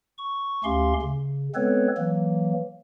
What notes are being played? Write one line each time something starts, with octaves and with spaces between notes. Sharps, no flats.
C#6
D2 A3 C#4 G4 F5 C6
C#3
G#3 B3 C4 A4 B4 C#5
E3 F#3 A#3